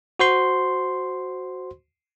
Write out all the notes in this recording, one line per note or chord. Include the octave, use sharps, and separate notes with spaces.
F#4 C5 C6